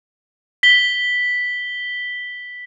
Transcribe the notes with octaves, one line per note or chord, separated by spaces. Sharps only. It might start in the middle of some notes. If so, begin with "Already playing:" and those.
B6 G7